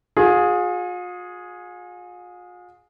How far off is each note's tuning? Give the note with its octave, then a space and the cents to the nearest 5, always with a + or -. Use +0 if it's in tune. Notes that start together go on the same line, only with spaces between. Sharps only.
F4 +45 G#4 +0